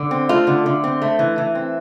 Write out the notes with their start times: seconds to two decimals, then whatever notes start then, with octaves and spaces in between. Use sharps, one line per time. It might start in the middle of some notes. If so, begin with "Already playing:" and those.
Already playing: D3
0.11 C4
0.29 A3 F4
0.47 D3
0.66 D3
0.84 C4
1.02 A3
1.19 E3
1.38 E3
1.55 C4